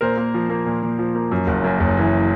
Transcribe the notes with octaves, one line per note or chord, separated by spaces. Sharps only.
A#2 A#4 C5
A#3
F3
A#3
A#2
A#2
F3
A#3
F#2
F#1
F#2
F#1
E3